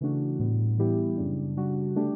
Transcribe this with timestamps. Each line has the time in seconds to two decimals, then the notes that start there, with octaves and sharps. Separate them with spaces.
0.01 C#3 E3 A3 D4 F#4
0.39 A2 G3 B3
0.78 E3 G3 B3 E4 G4
1.17 F#2 C#3 G3 D4
1.57 C#3 G3 D4 F#4
1.96 D3 A3 D4 G4